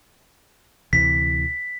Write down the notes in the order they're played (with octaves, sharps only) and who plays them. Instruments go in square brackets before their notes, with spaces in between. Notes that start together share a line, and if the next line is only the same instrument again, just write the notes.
[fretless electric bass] D2 C3 E3 [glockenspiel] B6